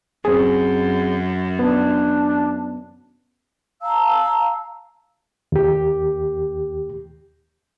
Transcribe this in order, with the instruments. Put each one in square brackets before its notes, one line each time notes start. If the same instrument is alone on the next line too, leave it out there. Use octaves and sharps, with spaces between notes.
[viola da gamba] F#2 [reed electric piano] C4 G#4
[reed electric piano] B3 [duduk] D4
[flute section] F5 A5 A#5 E6
[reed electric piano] D#2 G4